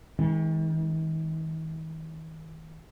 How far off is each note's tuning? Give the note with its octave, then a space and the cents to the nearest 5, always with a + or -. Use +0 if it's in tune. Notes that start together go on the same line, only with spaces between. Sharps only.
D#3 +45 G#3 +0 C#4 +0